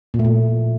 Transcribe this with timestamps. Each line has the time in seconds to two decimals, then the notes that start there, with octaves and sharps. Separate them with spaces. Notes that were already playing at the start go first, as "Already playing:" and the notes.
0.14 A#2
0.19 A3
0.25 A#2